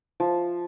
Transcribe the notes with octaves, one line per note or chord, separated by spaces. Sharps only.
F3